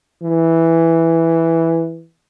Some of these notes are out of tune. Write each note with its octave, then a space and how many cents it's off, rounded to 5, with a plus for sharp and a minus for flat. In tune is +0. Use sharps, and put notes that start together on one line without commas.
E3 +0